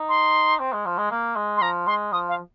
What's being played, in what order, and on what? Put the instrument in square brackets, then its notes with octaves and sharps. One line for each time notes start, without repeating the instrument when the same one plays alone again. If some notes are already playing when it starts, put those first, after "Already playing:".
Already playing: [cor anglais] D#4
[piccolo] C6
[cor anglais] C4
G#3
F3
G#3
A#3
G#3
[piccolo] C6
[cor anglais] F3 [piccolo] A#5
[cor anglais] G#3 [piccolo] C6
[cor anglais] F3 [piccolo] D#6
[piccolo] F5